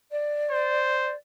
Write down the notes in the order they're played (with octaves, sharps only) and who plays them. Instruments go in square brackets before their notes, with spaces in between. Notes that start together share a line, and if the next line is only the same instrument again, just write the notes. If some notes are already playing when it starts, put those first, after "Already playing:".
[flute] D5
[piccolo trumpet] C5